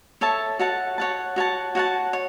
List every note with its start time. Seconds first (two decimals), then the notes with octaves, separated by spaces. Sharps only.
0.21 A4 C#5 E5 A5
0.59 F#4 C#5 F#5 A5
0.98 F#4 C#5 F#5 A5
1.36 F#4 C#5 F#5 A5
1.75 F#4 C#5 F#5 A5
2.13 C#5